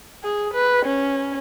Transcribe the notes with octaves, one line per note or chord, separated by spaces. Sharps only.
G#4
B4
C#4